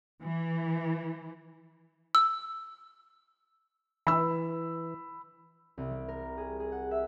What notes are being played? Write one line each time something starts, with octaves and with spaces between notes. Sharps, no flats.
E3
E6
E3 B5 E6
C2
G3
A#4
G#4
G#4
F#5
E5